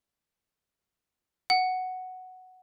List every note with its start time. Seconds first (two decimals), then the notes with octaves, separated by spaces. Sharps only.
1.50 F#5